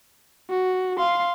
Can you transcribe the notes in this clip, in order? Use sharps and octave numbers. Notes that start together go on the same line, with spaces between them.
F#4
F5 C6